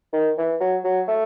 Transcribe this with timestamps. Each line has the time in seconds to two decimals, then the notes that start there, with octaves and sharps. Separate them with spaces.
0.13 D#3
0.38 E3
0.61 F#3
0.84 F#3
1.08 A3